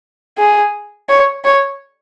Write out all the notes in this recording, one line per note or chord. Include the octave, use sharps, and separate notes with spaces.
G#4
C#5
C#5